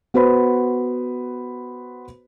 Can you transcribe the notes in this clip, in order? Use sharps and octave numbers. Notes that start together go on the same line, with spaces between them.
B3 F#4 B4 C5 B5